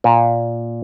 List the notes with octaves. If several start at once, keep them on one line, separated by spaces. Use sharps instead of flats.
A#2